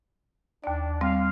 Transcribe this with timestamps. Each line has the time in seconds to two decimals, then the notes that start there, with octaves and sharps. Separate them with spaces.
0.64 D#2 D4 D5
1.01 G3 C4 F5